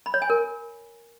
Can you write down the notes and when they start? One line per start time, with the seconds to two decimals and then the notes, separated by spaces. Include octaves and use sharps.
0.06 B5
0.14 C#5
0.22 G#5
0.30 A#4